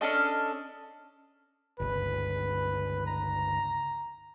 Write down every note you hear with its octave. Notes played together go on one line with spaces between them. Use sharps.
C#4 D4 A4 D#5
G1 C#2 B4
A#5